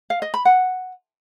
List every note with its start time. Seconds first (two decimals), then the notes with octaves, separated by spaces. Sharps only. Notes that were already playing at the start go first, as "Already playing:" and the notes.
0.10 F5
0.22 D#5
0.34 B5
0.45 F#5